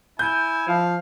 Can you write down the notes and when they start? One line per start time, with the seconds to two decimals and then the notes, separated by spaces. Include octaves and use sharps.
0.19 E4 G#5 G6
0.68 F3 F5